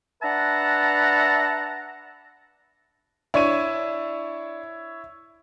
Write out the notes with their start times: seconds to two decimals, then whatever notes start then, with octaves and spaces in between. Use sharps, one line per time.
0.23 D4 B4 E5 F#5 A5 A#5
3.34 D4 E4 C#5 D#7